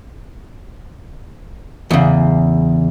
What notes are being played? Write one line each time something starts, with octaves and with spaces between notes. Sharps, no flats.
E2 C#3